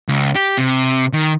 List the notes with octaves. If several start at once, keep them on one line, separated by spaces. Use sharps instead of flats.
C#2
G4
C3
D#3